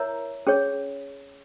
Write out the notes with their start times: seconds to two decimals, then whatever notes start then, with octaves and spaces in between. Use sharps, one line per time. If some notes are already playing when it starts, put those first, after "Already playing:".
Already playing: E4 A#4 C#5 E5 A#5
0.47 C#4 G#4 C#5